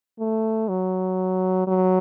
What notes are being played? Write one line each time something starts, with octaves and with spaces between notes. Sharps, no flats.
A3
F#3
F#3